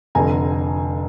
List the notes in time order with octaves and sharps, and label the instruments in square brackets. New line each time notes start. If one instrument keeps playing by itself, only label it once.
[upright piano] F1 F2 D3 G#5 A#5